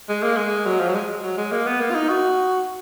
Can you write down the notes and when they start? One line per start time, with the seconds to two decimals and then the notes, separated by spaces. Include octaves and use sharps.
0.09 G#3
0.23 A#3
0.37 G#3
0.66 F#3
0.80 F3
0.89 F#3
0.94 G#3
1.23 F#3
1.37 G#3
1.52 A#3
1.66 B3
1.81 A#3
1.91 F4
1.95 D#4
2.09 F#4